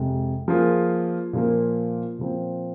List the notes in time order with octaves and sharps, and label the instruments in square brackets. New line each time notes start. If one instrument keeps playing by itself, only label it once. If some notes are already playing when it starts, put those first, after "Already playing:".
Already playing: [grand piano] F2 C3 G#3
F3 A#3 F4 G#4
A#2 F3 A#3
A#2 F3 C4